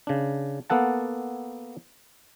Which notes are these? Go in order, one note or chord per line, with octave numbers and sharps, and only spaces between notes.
C#3 D4
A#3 B3 A4 F#5 A5